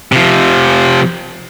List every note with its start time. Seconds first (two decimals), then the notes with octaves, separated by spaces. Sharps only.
0.12 C3 F3